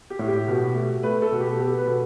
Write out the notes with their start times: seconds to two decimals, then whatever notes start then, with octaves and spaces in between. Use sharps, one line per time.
0.10 G4
0.19 A2
0.28 G4
0.48 B2
0.75 A3
1.03 A3 B4
1.22 A4
1.32 B2
1.40 G4
1.59 B3 A4
1.78 B4
1.87 B2